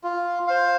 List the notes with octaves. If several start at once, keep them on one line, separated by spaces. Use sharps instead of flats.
F4
C5 F5